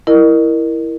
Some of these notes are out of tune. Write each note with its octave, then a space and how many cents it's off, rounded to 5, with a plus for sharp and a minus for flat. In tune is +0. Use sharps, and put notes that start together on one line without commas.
E4 +0 A#4 +0 D#5 -35